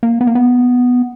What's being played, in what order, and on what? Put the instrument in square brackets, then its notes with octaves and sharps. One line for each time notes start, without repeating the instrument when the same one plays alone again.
[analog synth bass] A#3
B3
A#3
B3